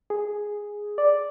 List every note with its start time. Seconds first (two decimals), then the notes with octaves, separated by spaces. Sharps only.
0.10 G#4
0.98 D5